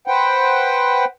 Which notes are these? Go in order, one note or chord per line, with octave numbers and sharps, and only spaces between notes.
B4 C5 F#5 G5